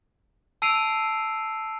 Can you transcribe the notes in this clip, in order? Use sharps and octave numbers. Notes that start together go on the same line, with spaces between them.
A5 E6 C7 D7 D#7 F7